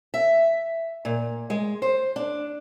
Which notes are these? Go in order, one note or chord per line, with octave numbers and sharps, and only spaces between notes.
E5
A#2
G#3
C5
D4